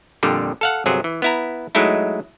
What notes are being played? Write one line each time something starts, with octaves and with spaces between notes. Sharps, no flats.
F2 A#2 D3 G3
A4 F5 F#5
G1 C3 F#3 G#4
E3
B3 E4 A#5
F#3 G#3 A3 D#4 E4